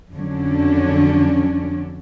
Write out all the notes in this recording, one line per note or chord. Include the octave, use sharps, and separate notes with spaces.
F2 D3 F#3 C#4 D4